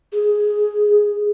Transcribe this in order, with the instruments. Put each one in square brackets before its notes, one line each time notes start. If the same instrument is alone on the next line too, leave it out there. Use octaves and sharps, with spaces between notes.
[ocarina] G#4